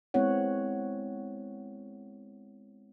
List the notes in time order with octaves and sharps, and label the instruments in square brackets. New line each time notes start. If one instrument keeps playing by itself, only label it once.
[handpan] G#3 B3 C4 E4 C#5 F#5